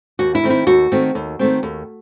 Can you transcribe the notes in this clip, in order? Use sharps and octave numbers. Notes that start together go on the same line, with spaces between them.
D#2 F#4
E4
D#3 A3 C4
E4
D#2 F#4
D#3 A3 C4
D#2
D#3 A3 C4
D#2